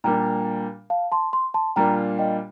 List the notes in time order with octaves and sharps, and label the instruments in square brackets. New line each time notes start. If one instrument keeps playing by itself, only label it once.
[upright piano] A#2 G3 A#3 D4 [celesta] G5 A#5
[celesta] F5 A5
A5 C6
C6
A5 C6
[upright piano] A#2 G3 A#3 D4 F4 [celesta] G5 A#5
[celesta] D#5 G5